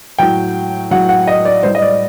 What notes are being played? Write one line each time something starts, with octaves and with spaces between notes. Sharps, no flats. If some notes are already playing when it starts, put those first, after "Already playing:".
A2 F#3 G5
A2 F#3 F#5
F#5
D#5
D5
A2 G3 C5
D#5
D5